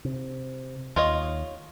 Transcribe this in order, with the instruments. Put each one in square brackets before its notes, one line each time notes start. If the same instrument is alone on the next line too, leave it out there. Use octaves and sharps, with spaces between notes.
[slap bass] C3
[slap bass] D#2 [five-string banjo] F4 C#5 D#5